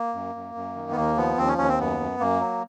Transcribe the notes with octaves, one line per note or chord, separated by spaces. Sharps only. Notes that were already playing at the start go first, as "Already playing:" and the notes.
Already playing: A#3
F#2
F#2
F#2
D#3
B3
D#2 A#3
F3 B3
D#2 C4
C#4
D#2 C#4
C4
F#2 B3
F#2
F#2 A#3
F#3